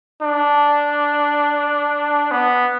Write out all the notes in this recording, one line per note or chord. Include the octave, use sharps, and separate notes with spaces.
D4
B3